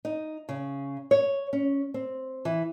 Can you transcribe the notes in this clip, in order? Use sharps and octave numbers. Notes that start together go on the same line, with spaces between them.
D#4
C#3
C#5
C#4
C4
E3